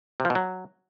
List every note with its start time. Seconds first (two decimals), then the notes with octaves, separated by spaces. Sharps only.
0.20 C3
0.25 F3
0.30 B2
0.35 F#3